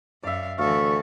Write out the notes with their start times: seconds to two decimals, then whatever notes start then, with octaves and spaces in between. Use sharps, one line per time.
0.23 F#2 D5 E5 F5
0.58 D2 E3 A4 F5 C#6